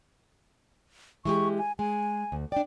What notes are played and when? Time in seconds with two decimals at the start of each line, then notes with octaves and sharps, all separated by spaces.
1.25 E3 G#3 G4 C#6
1.58 G#5
1.79 G#3 G#5
2.32 D2
2.52 D4 D5 G5